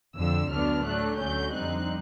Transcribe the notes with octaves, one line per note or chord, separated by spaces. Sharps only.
F2 D3 F3 E6
D2 D3 F#3 B3 D4 F6
A2 F#3 A3 D4 F#6
D2 D3 F#3 A3 C#4 G6
F2 D3 G3 C4 D#4 F#6